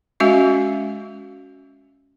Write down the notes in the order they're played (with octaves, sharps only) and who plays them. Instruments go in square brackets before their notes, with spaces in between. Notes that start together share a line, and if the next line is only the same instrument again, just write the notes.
[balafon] G#3 C#4 F#4 E5 F5